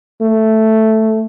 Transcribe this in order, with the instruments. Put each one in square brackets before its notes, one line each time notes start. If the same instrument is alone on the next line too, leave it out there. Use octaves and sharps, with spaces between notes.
[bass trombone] A3